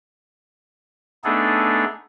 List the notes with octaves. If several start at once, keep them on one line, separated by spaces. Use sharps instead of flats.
A3 B3 D4 D#4 G#4 A4